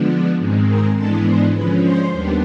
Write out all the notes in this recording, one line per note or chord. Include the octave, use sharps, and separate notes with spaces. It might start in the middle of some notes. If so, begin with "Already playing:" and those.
Already playing: D3 F3 G#3 B3 D4
G#2 D#3 G#3 C4
A#4 A#5
G#2 E3 G#3 B3 D4 A4 A5
C5 C6
D3 F3 G#3 C#4 B4 B5
C5 C6
D#2 D#3 G3 B3 D4